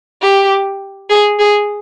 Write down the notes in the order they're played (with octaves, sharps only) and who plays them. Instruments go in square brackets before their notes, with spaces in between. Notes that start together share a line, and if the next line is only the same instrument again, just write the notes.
[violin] G4
G#4
G#4